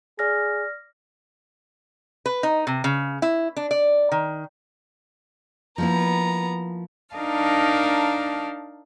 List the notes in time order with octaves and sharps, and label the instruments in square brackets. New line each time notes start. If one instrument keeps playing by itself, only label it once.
[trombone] G#4 [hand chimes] D5 F6 A#6
[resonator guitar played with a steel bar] B4
D#4
C3
C#3
E4
D4
D5
D#3
[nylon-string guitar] F3 A#3 E4 [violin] B3 A#5
[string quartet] D4 D#4 A#4 F5 A5